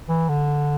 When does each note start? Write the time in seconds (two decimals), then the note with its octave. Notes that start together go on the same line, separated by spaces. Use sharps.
0.09 E3
0.29 D3